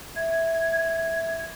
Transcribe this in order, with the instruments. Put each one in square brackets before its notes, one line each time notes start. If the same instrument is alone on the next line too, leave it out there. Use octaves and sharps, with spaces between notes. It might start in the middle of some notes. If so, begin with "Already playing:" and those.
[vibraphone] E5 [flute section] G#6